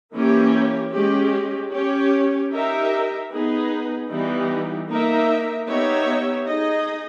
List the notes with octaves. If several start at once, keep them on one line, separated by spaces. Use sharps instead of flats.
E3 A#3 C#4 G4 C#5
G#3 C#4 G4
C#4 G4 C#5
D#4 G4 A#4 E5
B3 D#4 G#4 B4
E3 G3 B3 D#4 G4
A#3 D#4 A#4 E5
B3 D#4 G4 C#5 E5
D#4 G#4 D#5